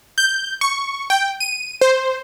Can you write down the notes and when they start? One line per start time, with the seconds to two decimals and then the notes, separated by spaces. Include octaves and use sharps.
0.18 G6
0.61 C#6
1.10 G5
1.40 D#7
1.81 C5